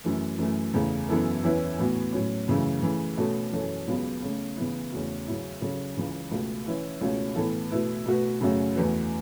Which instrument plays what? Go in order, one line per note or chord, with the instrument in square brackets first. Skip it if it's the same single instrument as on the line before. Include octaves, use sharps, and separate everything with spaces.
[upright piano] F#2 E3 A3
F#2 E3 A3
E2 C#3 A3
F#2 E3 B3 E4 A4
E2 E3 C#4 E4 B4
A2 E3 B3 F#4
A2 F#3 C#4
F#2 C#3 E3 A3
C#3 E3 A3
B2 A3 C#4 F#4 A4
F#2 E3 C#4 A4
C#2 C#3 F#3 B3
C#3 A3 C#4
C#3 E3 B3 E4
E2 C#3 A3 C#4 F#4
C#3 F#3 C#4 E4
C#3 F#3 C#4 A4
C#2 C#3 E3
C#2 B2 A3
E3 C#4 E4 B4
C#2 B2 A3 C#4
A2 E3 B3 A4
B2 A3 E4 B4
B2 A3 F#4 B4
F#2 C#3 A3 C#4 F#4
E2 E3 A3 F#4 B4